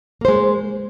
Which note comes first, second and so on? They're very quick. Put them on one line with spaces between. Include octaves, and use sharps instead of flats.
A#3 C5 G#3